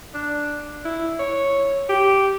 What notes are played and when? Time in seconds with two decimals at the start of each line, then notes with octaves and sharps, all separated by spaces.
0.14 D4
0.85 E4
1.19 C#5
1.89 G4